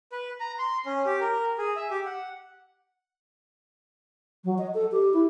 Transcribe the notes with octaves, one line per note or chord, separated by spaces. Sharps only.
B4
A#5
C6
C#4
G4
A#4
G#4
E5
G4
F#5
F#3
D#5
A4
G4
E4